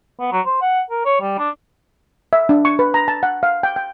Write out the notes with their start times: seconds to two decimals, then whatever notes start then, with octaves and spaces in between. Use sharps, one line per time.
0.20 B3
0.32 F#3
0.46 C5
0.62 F#5
0.90 A#4
1.05 C#5
1.21 G3
1.38 D4
2.33 E5
2.49 D4
2.65 C#6
2.79 B4
2.94 A#5
3.08 A5
3.23 F#5
3.43 F5
3.63 G5
3.76 G5